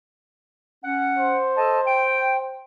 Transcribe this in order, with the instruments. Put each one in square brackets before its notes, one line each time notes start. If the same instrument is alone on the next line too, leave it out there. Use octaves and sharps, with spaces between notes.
[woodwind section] C#4 F#5
[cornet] C5
[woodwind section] A4 D#5 A5
G5